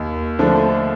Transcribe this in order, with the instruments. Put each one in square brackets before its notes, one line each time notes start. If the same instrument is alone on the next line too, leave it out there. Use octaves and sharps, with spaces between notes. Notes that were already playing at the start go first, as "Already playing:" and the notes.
Already playing: [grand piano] D#2
D3 F3 A3 D4